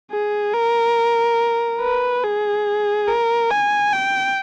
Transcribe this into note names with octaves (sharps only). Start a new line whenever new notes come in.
G#4
A#4
B4
G#4
A#4
G#5
G5